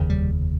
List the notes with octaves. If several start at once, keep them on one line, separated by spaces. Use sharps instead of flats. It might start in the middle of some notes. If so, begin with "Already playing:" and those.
Already playing: F1 D#2 C#3
G3